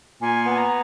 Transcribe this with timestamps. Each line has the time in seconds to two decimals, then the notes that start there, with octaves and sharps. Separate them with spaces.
0.21 A#2 G#5
0.45 B3 G#5
0.58 A#5